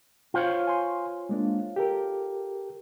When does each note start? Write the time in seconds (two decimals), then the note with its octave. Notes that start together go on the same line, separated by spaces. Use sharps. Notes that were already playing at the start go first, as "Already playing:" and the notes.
0.34 F4 C5 C#5
0.67 G#5 C6
1.29 G#3 A#3 D4
1.76 G4 A4 A#4